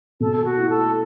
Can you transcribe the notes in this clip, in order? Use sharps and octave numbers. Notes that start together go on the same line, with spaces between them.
B2 A4
A4
F#4
A3 E4
A4